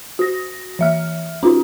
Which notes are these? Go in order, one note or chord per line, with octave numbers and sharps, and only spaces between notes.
F#4 A#6
E3 E5 F6
C#4 D#4 F4 F#4